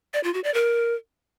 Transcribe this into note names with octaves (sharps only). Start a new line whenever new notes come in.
D5
F4
F#4
D5
A#4